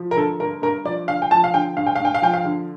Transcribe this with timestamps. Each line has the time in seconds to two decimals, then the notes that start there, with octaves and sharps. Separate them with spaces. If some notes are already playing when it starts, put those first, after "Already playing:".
Already playing: F3
0.11 A#4
0.16 D3 A4
0.40 G2 A#4
0.62 G2 A#4
0.85 F3 D5
1.08 D3 F5
1.22 G5
1.31 F3 A5
1.44 F5
1.54 D3 G5
1.77 G2 F5
1.86 G5
1.95 G2 F5
2.05 G5
2.14 F5
2.22 F3 G5
2.33 F5
2.45 D3